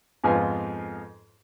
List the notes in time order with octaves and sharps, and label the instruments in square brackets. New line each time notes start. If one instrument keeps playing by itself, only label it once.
[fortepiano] F2 G#2 F3 B3 F4 G#5